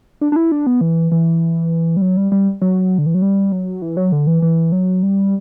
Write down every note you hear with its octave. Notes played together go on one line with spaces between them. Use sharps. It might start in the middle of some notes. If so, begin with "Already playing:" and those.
D4
D4
E4
D4
B3
E3
E3
G3
F#3
G3
G3
F#3
D3
E3
F#3
G3
F#3
E3
F#3
D3
E3
E3
F#3
G3